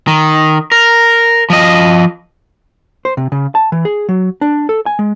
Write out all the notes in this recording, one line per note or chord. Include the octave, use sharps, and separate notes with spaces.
D#3
A#4
F3 D#5
C5
C3
C#3
A5
E3
G#4
F#3
D4
A4
G#5
G#3